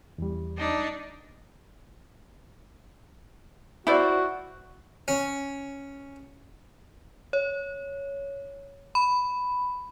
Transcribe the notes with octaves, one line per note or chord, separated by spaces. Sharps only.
E2 G3
D4 D#4
E4 F#4 C5 D5
C#4
C#5
B5